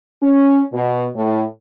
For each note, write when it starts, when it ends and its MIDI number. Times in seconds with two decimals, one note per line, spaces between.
0.23 0.63 61
0.73 1.07 47
1.16 1.44 45